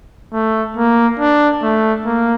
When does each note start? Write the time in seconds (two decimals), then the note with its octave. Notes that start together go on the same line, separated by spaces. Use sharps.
0.33 A3
0.77 A#3
1.20 D4
1.63 A3
2.06 A#3